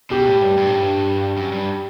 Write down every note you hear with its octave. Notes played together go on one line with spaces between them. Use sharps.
B2 G4
A2
G2
G2
A2
G2
F#2
G2